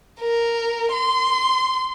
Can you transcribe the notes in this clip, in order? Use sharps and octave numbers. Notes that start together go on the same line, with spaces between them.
A#4
C6